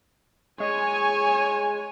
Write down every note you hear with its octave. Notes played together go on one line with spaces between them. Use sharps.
G#3 C#5 G#5